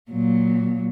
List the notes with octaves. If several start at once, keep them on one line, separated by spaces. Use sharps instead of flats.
A#2 F#3